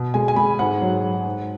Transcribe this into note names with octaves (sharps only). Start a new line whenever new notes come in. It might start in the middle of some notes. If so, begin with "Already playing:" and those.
Already playing: B2
G#3 G#5
G#5
G#3 B5
G#2 F#5
F#3
F#3
G#2